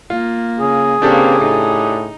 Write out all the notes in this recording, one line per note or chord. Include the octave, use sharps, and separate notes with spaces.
A#3 F4
C#3 G#4
C#3 A#3 C4 D4 G4 A4
A2 D#4